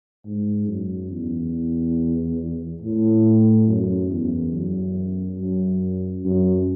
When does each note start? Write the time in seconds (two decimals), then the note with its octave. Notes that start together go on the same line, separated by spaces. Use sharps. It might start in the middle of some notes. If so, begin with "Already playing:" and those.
0.25 G#2
0.67 F#2
1.10 E2
2.82 A2
3.68 F#2
4.10 E2
4.53 F#2
5.38 F#2
6.24 F#2